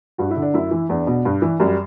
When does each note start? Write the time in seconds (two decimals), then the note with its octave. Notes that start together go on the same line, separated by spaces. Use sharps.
0.18 G2 F#4
0.31 E4
0.36 D3
0.42 D4
0.54 F#2 E4
0.71 E3
0.89 E2 D4
1.07 B2
1.25 G2
1.42 E3
1.60 F#2 G3